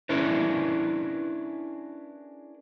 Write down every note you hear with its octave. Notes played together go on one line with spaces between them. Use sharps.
C#4 D4 E4 G#4 A#4 B4